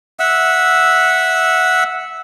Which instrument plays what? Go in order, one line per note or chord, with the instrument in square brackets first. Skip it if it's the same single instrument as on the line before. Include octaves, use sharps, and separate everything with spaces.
[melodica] E5 F#5 E6